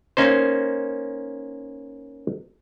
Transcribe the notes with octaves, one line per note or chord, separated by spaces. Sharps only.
A#3 C#4 D#4 C5